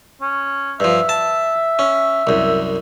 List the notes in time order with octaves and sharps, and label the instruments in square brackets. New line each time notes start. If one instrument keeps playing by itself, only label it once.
[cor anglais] C#4
[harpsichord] G2 F3 [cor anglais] E5
[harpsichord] A5
C#4
C2 F#2